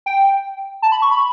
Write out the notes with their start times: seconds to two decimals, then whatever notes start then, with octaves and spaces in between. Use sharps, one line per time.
0.06 G5
0.82 A5
0.92 B5
1.02 C#6
1.11 B5